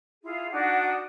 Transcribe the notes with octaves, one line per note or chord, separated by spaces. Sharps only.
E4 F4 G#4
D4 D#4 F#4 F#5